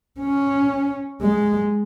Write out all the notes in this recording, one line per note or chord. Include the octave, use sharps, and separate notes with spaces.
C#4
G#3